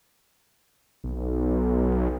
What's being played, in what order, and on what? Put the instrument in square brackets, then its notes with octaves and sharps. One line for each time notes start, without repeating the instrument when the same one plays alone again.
[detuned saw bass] B1